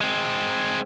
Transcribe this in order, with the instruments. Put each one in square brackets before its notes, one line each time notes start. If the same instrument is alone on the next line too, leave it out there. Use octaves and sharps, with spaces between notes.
[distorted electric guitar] G#3 C4